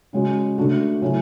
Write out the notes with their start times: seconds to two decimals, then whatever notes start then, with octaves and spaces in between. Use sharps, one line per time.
0.13 C#3 G#3 C#4 F#4
0.58 D3 A3 D4 F#4
1.02 C#3 F#3 A3 C#4 E4